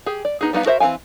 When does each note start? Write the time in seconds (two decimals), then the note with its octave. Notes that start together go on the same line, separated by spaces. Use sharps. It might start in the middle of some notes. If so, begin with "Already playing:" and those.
0.06 G4 G#4
0.25 D5
0.41 B3 D#4 G#4
0.53 G3 B3 D#4 F5
0.65 F#4 A#4 C5 D#5 E5
0.80 E3 C4 A4 F5 G#5